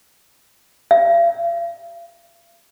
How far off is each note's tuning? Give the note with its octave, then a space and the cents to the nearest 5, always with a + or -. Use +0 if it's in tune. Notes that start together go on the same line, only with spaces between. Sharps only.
F5 -45